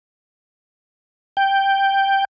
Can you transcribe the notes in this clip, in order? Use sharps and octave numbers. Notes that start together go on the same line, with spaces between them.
G5